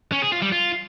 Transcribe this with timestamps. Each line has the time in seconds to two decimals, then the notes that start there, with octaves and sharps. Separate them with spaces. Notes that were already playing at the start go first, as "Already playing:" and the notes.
0.12 C#4
0.22 G#4
0.32 F4
0.42 G3
0.52 F4